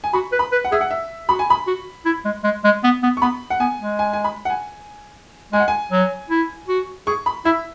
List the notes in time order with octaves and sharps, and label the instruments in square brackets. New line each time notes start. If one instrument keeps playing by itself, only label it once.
[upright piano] G#5
[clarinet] F#4 [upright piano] B5
[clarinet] B4
[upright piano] B5
[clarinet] B4
[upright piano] F#5
[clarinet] G#4 [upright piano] E5
[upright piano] F#5
E5
[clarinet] F#4 [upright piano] B5
[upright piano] G#5
B5
[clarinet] F#4
E4
G#3
G#3
G#3
B3
B3
[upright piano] C#6
[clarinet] B3 [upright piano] B5
[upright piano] F#5
[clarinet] B3 [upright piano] G#5
[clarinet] G#3
[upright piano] G#5
G#5
B5
F#5
G#5
[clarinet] G#3 [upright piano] G#5
[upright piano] F#5
G#5
[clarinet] F#3
E4
F#4
[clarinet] G#4 [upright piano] C#6
[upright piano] B5
[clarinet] E4 [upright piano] E5